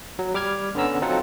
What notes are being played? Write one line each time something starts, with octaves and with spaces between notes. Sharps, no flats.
F#3
G3 D6 F6 G#6
D3 B3 C#4 A#5 E6
F#3 C4 D#4 F4 A4 F#5